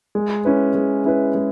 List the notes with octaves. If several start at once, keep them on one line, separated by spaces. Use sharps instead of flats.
G#3
C#4 E4 B4
G#3
C#4 E4 B4
G#3